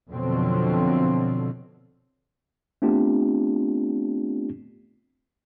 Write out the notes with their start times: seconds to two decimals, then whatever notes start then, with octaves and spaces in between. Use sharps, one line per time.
0.11 F2 B2 D3 F3 F#3 C4
2.82 A3 B3 C4 D4 F4 G4